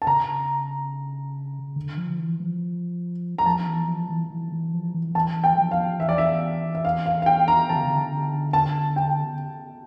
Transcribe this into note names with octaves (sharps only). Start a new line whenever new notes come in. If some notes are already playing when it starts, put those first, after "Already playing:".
A5
C#3 A#5
D3
F3
E3
F3
A#5
F3 A5
E3
F3
E3
E3
E3
F3
E3
E3 A5
G5
F3
F5
E3 E5
D5
E5
E5
F5
F5
F5
G5
A#5
E3 A5
D3
C#3
D3
A5
G5